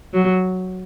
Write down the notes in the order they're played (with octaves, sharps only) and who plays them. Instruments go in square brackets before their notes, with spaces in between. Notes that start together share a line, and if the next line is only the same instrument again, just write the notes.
[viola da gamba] F#3